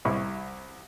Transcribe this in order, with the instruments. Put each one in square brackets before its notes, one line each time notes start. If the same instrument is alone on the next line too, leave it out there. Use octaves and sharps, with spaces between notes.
[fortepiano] C2 E4 C#6